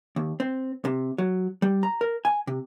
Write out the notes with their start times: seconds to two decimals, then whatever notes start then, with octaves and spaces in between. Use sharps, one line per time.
0.16 D#2
0.40 C4
0.85 C3
1.18 F#3
1.62 G3
1.83 A#5
2.01 A#4
2.25 G#5
2.47 C3